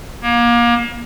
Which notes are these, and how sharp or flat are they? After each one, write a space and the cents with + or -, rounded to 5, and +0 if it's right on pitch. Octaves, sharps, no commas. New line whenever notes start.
A#3 +30